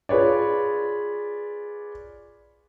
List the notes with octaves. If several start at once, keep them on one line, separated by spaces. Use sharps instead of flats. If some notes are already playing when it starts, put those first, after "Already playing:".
F4 G#4 B4 C#5 D5